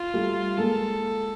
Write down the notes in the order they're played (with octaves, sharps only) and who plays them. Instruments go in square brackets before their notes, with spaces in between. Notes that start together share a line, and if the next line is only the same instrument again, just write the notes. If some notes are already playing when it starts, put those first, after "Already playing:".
Already playing: [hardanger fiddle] F4
[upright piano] G3 A3
[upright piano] G#3 A#3 [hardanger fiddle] A4